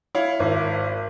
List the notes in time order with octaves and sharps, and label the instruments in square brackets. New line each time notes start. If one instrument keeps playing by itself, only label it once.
[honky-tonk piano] E4 C#5 F5
[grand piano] G#1